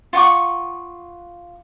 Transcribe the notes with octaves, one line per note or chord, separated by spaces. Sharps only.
F4 F#5 C#6 D6